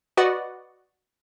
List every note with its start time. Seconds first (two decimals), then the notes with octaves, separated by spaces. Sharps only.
0.17 F#4 B4 D5 D#5 F#5